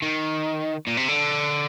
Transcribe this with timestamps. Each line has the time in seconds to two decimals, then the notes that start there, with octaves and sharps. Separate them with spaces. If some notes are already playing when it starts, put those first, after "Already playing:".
0.02 D#3
0.87 A#2
0.97 C3
1.08 D3